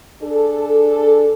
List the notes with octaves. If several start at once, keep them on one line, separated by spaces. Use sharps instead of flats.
D4 G#4 A4